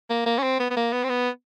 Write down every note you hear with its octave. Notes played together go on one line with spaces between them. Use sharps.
A#3
A#3
C#4
C4
B3
B3
A#3
B3
C4
B3